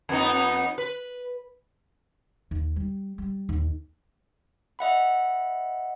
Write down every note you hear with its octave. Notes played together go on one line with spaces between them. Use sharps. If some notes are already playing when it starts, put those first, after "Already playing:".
F2 B3 D#4
B4
D#2
G3
G3
D#2
D#5 E5 F#5 B5